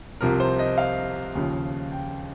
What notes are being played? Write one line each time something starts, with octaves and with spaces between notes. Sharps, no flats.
C2 C3 F3 A#4
C5
D#5
F5
D#2 C#3 F3
G5